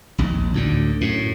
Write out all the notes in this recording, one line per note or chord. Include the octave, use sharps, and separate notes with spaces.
A#1 D#2
D2 A2 D3
F#2 A2